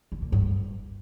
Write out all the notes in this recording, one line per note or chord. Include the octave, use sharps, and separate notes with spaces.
D3
A#2
G2